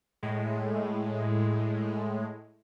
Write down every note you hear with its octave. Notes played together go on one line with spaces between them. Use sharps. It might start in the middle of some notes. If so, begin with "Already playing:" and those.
A2 G#3